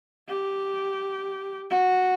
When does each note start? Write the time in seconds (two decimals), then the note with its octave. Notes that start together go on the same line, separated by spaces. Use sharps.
0.29 G4
1.70 F#4